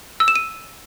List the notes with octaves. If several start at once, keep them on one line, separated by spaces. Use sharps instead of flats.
E6
E7
D#7